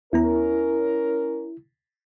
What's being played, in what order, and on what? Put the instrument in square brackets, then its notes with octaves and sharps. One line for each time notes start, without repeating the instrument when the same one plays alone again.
[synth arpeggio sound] D#2 B3 A#5 [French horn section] C#4 A#4 [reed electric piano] E4